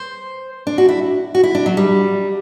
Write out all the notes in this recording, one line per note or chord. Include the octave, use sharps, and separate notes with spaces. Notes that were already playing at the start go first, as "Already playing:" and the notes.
Already playing: C5
D4
F#4
E4
F#4
E4
D4
F#3
G3